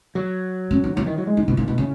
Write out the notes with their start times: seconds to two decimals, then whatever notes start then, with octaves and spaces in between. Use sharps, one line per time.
0.15 F#3
0.71 C#4
0.84 D#4
0.96 F#3 E4
1.06 D#3
1.18 F#3
1.27 G#3
1.37 D#4
1.48 B2 E4
1.57 A#2 D#4
1.67 B2 E4
1.78 C#3 E4